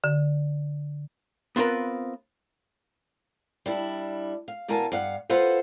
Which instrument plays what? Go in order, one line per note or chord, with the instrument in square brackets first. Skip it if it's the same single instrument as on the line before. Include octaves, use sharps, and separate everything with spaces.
[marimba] D3
[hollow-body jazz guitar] B3 C4 F4 A#4 B4
[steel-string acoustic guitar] G3 D4 E4
F5
E2 B2 A#4 F5 G#5 A5
G2 F5 F#5
F4 F#4 A4 B4 C5 F5